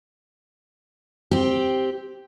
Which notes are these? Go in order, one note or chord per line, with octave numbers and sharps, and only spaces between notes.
C4 G4